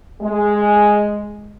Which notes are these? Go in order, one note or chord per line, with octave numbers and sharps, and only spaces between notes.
G#3